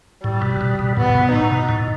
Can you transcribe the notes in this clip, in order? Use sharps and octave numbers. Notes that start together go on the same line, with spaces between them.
A2 G3
B2
B2
B2
A2 B3
A2
B2
A2 D#4
B2
A2